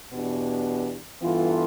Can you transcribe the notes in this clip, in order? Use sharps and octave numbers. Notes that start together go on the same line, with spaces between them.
E2 B2 B3 D4 G4
G2 E3 B3 F4 A4